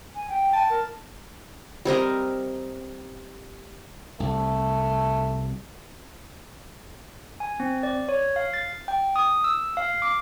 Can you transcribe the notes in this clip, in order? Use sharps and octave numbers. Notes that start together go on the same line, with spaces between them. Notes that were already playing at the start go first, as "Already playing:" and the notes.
G#5
G5
A5
A#4
G3 C4 A#4 D#5
C2 A3
G#5
C4
D5
C#5
F5
A6
G5
D#6
E6
F5
D6